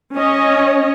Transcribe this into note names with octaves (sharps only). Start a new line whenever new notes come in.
C#4 C#5 D#5